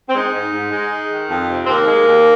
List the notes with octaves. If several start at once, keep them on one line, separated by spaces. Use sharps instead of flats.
C4
G#3 D#4
G#2
G#2
G#3
G#3
D#3
F2
C3
C4
D#2 A#3
G#3
D#2